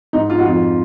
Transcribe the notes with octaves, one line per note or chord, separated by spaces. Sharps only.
G#2 D#4
G#2 F4
F#4
F2 F4